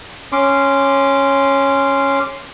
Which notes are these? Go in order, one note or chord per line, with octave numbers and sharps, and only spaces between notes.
C#4 C6 D6